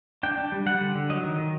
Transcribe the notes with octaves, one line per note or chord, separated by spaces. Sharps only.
D4 G5
D4
G3
G3 F#5
D3
D3
F#3 D#5
D#3
D#3